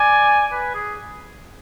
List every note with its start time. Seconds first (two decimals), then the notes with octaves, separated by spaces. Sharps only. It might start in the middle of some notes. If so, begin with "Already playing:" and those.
Already playing: D5 G#5
0.52 B4
0.74 G#4